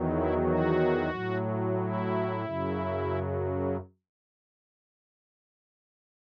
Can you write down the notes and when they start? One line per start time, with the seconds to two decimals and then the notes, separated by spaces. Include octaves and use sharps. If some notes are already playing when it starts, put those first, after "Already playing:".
Already playing: E2 D#3 F#3
0.10 E4
0.43 F#4
1.11 A2 F#3
1.78 E4
2.45 F#2 C#3 F#3